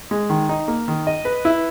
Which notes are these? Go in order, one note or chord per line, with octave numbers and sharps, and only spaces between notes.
G#3
D#3
D#4
A#3
D#3
D#5
B4
E4